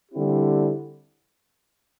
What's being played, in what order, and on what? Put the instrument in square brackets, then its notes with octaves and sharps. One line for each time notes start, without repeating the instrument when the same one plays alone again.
[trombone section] D3 G3 C4 E4 G4